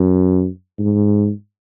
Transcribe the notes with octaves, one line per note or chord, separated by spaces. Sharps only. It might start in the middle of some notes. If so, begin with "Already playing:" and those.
Already playing: F#2
G#2